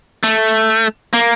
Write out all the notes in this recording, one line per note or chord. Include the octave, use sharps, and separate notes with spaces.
A3
A#3